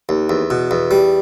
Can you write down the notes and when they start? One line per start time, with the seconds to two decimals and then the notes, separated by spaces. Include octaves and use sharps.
0.09 D#2
0.29 E2
0.50 B2
0.71 E2
0.91 G3